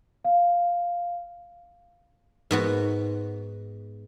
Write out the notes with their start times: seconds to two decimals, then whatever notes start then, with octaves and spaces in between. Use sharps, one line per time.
0.25 F5
2.51 G#2 B3 F#4